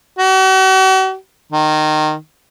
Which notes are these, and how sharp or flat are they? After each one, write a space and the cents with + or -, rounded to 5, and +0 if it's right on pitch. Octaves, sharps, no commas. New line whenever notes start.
F#4 +45
D#3 -20